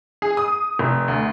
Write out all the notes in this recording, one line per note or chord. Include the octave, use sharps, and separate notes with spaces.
G#4
D#6
F1
D2